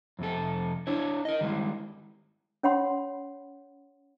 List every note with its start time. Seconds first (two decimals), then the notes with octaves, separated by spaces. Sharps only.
0.19 F2 C3 A4
0.87 D4 E4 C#5
1.25 A#4 D#5
1.41 D#3 G3 G#3 E4
2.63 C#4 C#5 F#5 B5 C6